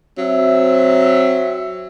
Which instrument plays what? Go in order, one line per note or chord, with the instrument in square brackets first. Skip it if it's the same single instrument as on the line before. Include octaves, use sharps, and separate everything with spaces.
[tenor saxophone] F#3 [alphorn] C4 [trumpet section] E5